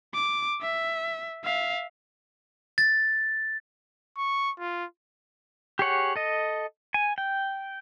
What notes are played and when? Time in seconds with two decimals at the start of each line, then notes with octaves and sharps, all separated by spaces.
0.14 D6
0.62 E5
1.44 E5 F5
2.78 A6
4.18 C#6
4.59 F4
5.79 G4 G#4 C#5 F#5
6.16 A4 D#5
6.94 G#5
7.18 G5